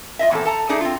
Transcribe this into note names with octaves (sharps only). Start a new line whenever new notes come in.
F4 D#5 E5
E2 A#2 C4 A4
A4 A5 A#5
A3 D4 D#4 G#4
C4 F4